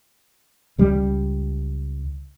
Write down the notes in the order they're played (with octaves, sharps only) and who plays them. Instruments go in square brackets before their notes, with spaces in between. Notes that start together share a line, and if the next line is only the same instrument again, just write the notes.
[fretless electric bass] C#2 G3